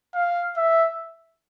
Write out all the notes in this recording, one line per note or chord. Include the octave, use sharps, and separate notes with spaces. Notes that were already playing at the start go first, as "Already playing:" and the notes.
F5
E5